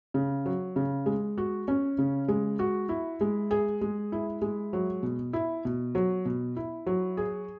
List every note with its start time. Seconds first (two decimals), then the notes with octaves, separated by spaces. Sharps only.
0.14 C#3
0.46 F#3
0.76 C#3
1.06 G#3
1.38 F#4
1.68 C#4
1.98 C#3
2.28 G#3
2.59 F#4
2.89 E4
3.21 G#3
3.51 G#4
3.81 G#3
4.12 E4
4.42 G#3
4.73 F#3
5.03 B2
5.33 E4
5.65 B2
5.95 F#3
6.25 B2
6.56 E4
6.86 F#3
7.17 G#4